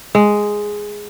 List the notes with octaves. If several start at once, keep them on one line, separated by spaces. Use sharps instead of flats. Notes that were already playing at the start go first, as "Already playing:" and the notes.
G#3